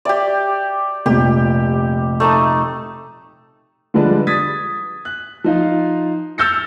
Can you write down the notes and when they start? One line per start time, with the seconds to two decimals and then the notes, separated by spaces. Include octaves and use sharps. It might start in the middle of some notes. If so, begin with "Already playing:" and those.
0.05 G4 D5 E5 G5
1.06 F1 A#1 G4
2.20 A3 D#4 A5
3.94 D3 F3 G3 G#3 D4 B4
4.27 D#6 G#6 A6 B6
5.05 F#6
5.44 F3 D#4 F4
6.38 E6 F6 G6 A6 A#6 C#7